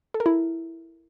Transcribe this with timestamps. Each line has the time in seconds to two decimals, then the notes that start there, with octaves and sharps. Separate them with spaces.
0.14 A4
0.20 A#4
0.26 E4